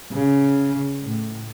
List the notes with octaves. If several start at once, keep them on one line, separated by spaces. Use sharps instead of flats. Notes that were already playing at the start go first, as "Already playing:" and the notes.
C#3
A2